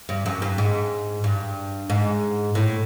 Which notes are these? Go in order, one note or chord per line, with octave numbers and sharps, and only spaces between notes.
G2
F#2
G2
G#2
G2
G#2
A2